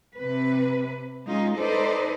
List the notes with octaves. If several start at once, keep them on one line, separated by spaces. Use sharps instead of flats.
C3 B4
G#3 C#4 D#4 F4
D#4 A4 B4 C5 D5 D#5